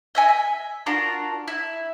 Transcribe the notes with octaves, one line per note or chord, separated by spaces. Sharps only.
D#5 E5 G#5
E5
D4 F4 F#4 A#4
E4